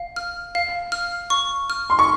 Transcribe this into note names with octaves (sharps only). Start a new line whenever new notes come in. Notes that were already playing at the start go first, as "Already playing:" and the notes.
Already playing: F5
F6
F5
F6
C#6
F6
C6
C#6